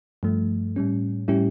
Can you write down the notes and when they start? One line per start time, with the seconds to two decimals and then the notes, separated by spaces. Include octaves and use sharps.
0.23 G2 F3 A3
0.76 A2 G3 C#4
1.28 A2 G3 C#4 E4 G4